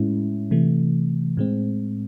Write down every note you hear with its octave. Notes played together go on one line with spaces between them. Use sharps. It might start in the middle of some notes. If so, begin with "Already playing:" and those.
Already playing: A2 G#3 C#4 E4
C3 E3 A3
A2 G#3 C4